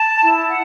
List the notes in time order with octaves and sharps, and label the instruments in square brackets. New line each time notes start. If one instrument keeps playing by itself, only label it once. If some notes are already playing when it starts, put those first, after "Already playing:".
Already playing: [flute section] A5
E4
F#5